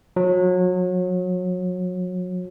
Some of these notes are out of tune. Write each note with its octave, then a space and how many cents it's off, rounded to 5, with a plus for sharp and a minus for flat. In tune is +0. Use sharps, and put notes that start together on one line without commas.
F#3 -30